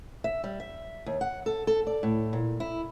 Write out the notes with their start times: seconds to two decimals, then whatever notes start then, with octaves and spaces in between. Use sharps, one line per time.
0.24 E5
0.44 G3
0.60 E5
1.06 D#2
1.21 F#5
1.46 A4
1.67 A4
1.87 D5
2.03 A2
2.33 A#2
2.60 E4